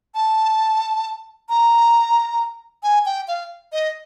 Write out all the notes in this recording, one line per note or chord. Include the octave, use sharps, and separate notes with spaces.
A5
A#5
G#5
G5
F5
D#5